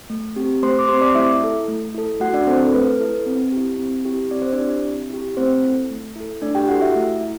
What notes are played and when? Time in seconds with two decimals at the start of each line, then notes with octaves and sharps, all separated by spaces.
0.10 A3
0.36 C4 G4
0.62 A3 C5 C6
0.79 D6
0.88 G4 C5 C6
0.93 C4
1.01 D5 D6
1.15 A3 E4 E5
1.41 E4 A4
1.68 A3
1.94 E4 A4
2.20 A3 F#4 F#5
2.33 D4 D5
2.47 C4 A4 C5
2.51 E4
2.60 A4
2.73 A3 B4
3.00 E4 A4
3.26 C4
3.52 E4 G4
3.79 C4
4.05 E4 G4
4.31 C4 D5
4.42 C5
4.53 D4 D5
4.58 E4 G4
4.84 C4
5.10 E4 G4
5.37 A3 C4 C5
5.63 E4 A4
5.90 A3
6.16 E4 A4
6.42 A3 D4 D5
6.55 G4 G5
6.68 E4 F#4 A4 F#5
6.82 E4 E5
6.95 A3
7.21 E4